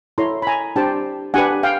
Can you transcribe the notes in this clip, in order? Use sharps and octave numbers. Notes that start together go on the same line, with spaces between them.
E4 A4 C#5 A#5 C6
B5
G#5 A#5
D4 G4 C5 G5 A5
D4 G4 B4 F#5 G#5
F5 G5